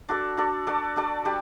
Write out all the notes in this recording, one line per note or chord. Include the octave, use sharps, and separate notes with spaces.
D4 F#4 A4 D5
D4 F#4 A4 D5
D4 F#4 A4 D5
D4 F#4 A4 D5
G3 D4 G4